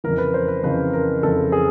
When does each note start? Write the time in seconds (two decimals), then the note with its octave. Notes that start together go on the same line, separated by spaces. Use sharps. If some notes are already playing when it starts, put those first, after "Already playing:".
0.04 F2 C#3 E3 A#4
0.18 B4
0.34 C5
0.48 B4
0.63 F2 C#3 E3 B4
0.93 A#4
1.23 F2 C#3 E3 A4
1.52 G#4